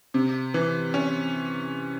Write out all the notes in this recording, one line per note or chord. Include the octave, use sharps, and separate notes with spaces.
C3
E3
C#4